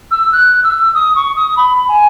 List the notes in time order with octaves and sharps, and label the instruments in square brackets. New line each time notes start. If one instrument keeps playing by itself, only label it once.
[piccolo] E6
F#6
E6
D#6
C#6
D#6
B5
G#5